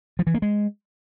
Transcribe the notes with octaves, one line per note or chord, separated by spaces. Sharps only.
F3
E3
A#3
G#3